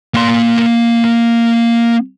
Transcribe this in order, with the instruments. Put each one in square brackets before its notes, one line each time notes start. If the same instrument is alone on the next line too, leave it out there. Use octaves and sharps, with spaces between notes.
[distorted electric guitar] A#3 C6